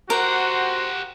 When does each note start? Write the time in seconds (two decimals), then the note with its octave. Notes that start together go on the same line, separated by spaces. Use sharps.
0.10 F#4 G4 A#4 C5 F#5